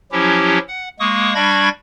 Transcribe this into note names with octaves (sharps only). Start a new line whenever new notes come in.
F3 F#3 C#4 E4 G4
F#5
G#3 A#3 C#6 D#6
G3 D4 B5 C#6 G#6 A#6